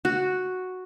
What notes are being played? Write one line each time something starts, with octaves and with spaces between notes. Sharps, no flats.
F#4